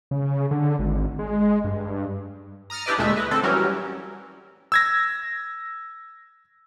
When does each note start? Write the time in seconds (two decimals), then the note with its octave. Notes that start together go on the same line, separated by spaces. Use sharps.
0.11 C#3
0.51 D3
0.79 G#1
1.19 G#3
1.64 G2
2.70 A#5 D#6 F6 A6 C#7
2.86 D4 E4 G4 B4 D5 D#5
2.98 D2 A#2 G#3 A3 E5
3.16 E4 B4 D#5
3.31 D3 C4 A4
3.43 E3 F#3 G3 C#4 A#4
4.72 E6 G#6 A#6